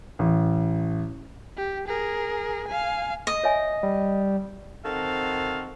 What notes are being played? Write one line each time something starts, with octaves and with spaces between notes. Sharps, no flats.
A1
G4
G#4 A#4
F5 G#5
D#5
C#5 E5 G#5
G3
D#3 C4 F#4 A4 F5